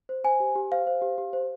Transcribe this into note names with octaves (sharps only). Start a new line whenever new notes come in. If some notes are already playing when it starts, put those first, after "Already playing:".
C5
C5 G#5
G4
G4
C5 F5
C5
G4
G4
C5